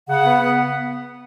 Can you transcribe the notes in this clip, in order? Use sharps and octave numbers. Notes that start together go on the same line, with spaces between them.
C#3 F#5
B3
B3